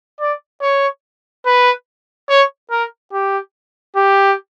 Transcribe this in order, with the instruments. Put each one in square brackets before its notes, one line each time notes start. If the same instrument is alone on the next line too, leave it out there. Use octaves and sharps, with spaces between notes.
[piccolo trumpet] D5
C#5
B4
C#5
A#4
G4
G4